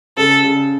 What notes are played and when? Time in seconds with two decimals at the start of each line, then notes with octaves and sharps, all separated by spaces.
0.17 C#3 A4
0.44 C#3